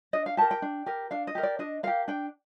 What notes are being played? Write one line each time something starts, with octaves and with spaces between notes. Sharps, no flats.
D4 D#5
F5
G4 A#4 A5
G5
D4
G4 A#4
D4 F5
D#5
G4 A#4
D5
D4 D#5
G4 A#4 F5
D4 G5